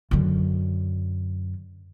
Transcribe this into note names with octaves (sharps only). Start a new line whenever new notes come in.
F#2 D3